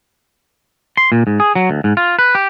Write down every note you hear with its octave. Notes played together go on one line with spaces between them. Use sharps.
C6
A#2
G#2
G#4
F#3
D2
G#2
F4
B4
G4